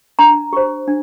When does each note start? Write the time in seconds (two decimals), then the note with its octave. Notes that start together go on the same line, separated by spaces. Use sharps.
0.19 D4 A#5
0.53 G4 C5
0.87 D4